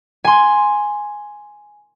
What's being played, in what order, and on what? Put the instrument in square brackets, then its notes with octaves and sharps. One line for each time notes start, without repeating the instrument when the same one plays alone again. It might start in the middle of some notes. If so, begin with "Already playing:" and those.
[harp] G#5 C6